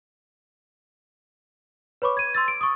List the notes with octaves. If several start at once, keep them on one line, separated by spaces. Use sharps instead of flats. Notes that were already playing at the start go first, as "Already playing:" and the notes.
B4 C#5 B5 C#6 D6
G#6 D#7
C6 E6 A6
D7
C#6 D#6